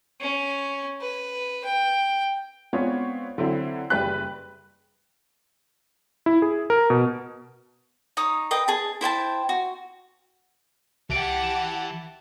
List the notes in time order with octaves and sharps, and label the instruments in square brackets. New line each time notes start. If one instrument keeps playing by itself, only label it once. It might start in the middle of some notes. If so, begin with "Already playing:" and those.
[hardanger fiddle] C#4
B4
G5
[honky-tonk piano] G#3 B3 C4 D4 F4 C#5
D3 F#3 C4 E4
F#1 G3 B4 G5 F#6
[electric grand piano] E4
G#4
A#4
B2
[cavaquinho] D#4 C#5 D#6
B4 D#5 G5
G#4 A5
E4 C5 G5 A5
F#4
[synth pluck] C2 D7 [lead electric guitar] E3 E5 [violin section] G4 F#5 A5
[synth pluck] E7